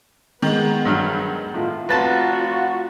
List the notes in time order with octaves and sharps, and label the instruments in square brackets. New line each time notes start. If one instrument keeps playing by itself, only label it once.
[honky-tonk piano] D#3 G#3 [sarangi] B3
[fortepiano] G2 F#3 F6
[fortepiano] A2 [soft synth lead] F4
[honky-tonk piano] F1 A6 [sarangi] F#4 [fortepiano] B4 A5